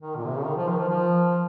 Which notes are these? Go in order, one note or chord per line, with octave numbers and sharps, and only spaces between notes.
D#3
A#2
C3
C#3
D#3
F3
D#3
F3
F3